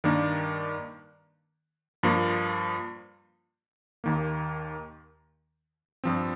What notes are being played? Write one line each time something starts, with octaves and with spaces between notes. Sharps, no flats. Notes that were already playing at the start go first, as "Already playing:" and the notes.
G2 D#3 A#3 D4
G2 F3 A#3 F4
D#2 D#3 A#3
G2 F3 C4